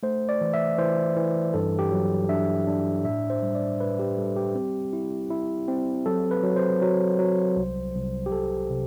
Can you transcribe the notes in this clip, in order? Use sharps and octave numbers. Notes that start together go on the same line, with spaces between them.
A3 C5
D5
E3
E5
E3 C5
E3
G2 A4
G4
F#3
D4 E5
D4
A2 E5
C5
G3
D5
A2 B4
G4
G3 A4
G4
C4
E4
E4
C4
F#3 A4
B4
F#3
C5
F#3
F#3
C2
C2
G4
C2 A4
C3